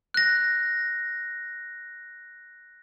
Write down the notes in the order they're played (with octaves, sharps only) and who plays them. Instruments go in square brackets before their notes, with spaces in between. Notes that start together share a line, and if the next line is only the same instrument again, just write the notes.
[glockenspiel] F#6 A#6